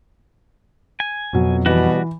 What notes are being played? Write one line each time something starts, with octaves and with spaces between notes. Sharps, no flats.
G#5
F2 B2 F#3
B2 E3 G3 F#4